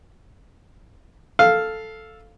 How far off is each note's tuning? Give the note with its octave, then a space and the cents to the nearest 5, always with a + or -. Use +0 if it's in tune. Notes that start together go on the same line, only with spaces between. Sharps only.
A4 +0 F5 +0